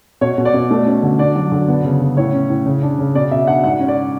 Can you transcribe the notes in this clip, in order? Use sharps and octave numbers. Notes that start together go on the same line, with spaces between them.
B2 C#5
B2
D5
B2
A3
C#4
D3
D4 D5
F#3
D3
B3
C#3
C#3
A2 C#5
C#4
A2
C#3
D4
C#3
B2 D5
B2 E5
D4 F#5
G#2 F#5
C#4
D5